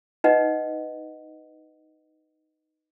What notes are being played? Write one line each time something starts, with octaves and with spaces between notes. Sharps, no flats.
D#4 B4 D#5 F#5